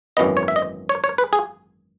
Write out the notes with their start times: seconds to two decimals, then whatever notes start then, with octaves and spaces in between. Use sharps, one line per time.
0.17 G#1 F#2 E3 B3 D#5
0.37 C#5
0.48 E5
0.56 D#5
0.89 C#5
1.04 C#5
1.18 B4
1.33 G#4